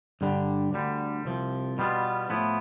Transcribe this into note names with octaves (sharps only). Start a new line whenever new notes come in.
G2 D3 G3 D4
D2 D3 G3
C2 C3 F3
B2 G3 B3 F4
A2 F3 B3 E4